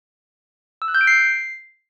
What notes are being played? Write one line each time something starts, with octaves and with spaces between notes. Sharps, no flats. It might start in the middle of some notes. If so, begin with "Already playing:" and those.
E6
F#6
G6
D7
C7